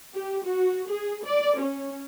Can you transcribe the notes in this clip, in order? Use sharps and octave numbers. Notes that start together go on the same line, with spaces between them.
G4
F#4
G#4
D5
C#4